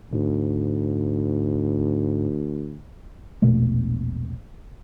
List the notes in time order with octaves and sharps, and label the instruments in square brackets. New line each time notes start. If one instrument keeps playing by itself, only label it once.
[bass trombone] D2 [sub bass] G#2
[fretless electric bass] E1 A#1 B2 A3